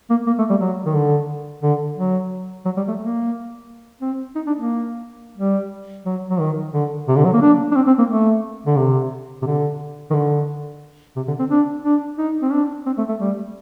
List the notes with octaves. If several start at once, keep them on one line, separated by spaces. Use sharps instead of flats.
A#3
A#3
A3
G3
F#3
D#3
D3
D3
F#3
F#3
G3
A3
A#3
C4
D#4
D4
A#3
G3
F#3
F#3
D#3
D3
C3
D3
F#3
A#3
D4
D4
C4
C4
A#3
A3
D3
C3
C3
D3
D#3
D3
C3
D3
C4
D4
D4
D#4
C4
D4
C4
A3
A3
G3